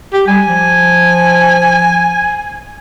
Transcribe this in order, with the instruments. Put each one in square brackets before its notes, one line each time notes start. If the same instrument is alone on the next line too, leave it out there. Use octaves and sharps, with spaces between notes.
[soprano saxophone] G4
[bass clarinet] G3 [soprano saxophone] G#5
[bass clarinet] F3